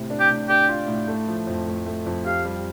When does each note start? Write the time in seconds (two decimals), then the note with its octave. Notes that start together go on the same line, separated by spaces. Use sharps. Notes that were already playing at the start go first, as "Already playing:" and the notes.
Already playing: A2 C3
0.10 D4
0.20 G4
0.29 A2
0.49 D4 G4
0.68 F4
0.88 A2
1.08 A3
1.28 F3
1.47 F2
1.67 A3
1.86 A3
2.06 F2
2.26 G4 F5
2.45 G3